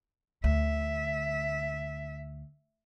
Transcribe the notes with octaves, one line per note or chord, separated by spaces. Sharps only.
D2 E5